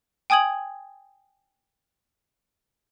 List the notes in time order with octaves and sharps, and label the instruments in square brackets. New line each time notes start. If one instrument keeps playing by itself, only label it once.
[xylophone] G5 G#5 D#6 G#6 F#7